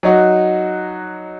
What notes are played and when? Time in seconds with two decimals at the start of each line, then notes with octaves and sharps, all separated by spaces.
0.03 F#3 D#4 F#4